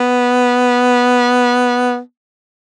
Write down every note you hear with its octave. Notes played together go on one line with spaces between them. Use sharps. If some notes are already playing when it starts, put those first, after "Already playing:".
Already playing: B3